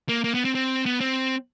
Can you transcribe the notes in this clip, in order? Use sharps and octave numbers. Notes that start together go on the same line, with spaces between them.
A#3
A#3
B3
C4
C4
B3
C4